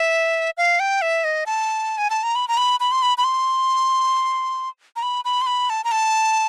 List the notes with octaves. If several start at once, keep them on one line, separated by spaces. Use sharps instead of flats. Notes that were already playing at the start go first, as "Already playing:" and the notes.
Already playing: E5
F5
G5
E5
D#5
A5
G#5
A5
A#5
B5
A#5
B5
B5
C6
B5
B5
C6
A#5
B5
B5
C6
B5
A5
A#5
A5